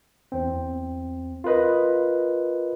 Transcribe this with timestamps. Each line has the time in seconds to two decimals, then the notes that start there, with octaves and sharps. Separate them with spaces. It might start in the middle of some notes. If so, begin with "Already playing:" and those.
0.32 E2 C4
1.44 F4 A#4 B4 D#5